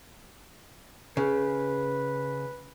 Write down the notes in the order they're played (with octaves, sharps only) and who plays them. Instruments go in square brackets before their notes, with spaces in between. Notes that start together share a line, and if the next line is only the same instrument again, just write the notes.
[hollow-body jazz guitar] C#3 [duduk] B4